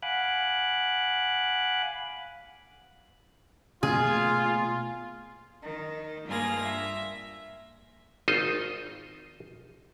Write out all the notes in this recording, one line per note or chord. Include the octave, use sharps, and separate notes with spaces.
F5 F#5 G#5 B5 D6 F#6
B2 A3 A#3 F4 G#4
D#3
G2 A#3 F4 G#4 A#6
E5
G#1 D#4 F4 C5 D#5